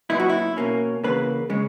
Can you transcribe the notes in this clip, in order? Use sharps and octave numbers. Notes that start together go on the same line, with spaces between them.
A#2 F#3 B3 D#4 E4
F#4
E4
B2 A#3 C#4
E2 C#3 E3 A#3 B4
C#3 G#3 C#4